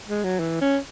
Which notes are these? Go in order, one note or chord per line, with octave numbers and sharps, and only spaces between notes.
G#3
F#3
E3
C#4